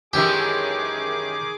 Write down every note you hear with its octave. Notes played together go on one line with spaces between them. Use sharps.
F#2 D#3 E3 G#3 G4 G#4 G#5 D6